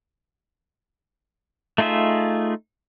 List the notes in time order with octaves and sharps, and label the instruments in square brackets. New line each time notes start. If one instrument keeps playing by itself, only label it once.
[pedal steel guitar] A3 D#4 F4 G#4 E5